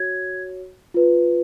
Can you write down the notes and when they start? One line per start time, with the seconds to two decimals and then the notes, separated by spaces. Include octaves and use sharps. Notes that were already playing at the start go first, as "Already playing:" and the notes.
Already playing: F#4 C#5 G#6
0.94 F4 B4